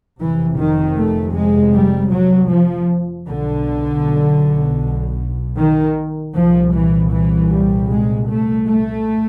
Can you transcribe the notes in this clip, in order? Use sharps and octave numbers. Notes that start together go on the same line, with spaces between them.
F1 F2 C3 E3
D#3
A3
G#3
G3
F#3
F3
B1 B2 D3
D#3
C2 A#2 F3
E3
E3
G3
G#3
A3
A3